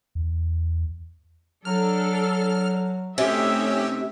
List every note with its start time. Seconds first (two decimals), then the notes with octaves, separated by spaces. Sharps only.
0.15 E2
1.65 F#3 D4 A4 F6
3.18 C3 A3 C#4 D#4 G4 E5